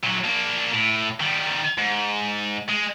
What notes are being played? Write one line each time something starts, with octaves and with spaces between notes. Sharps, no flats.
A#2 F#3
A#3 D4
A2
D#3 G3
G#2
G#3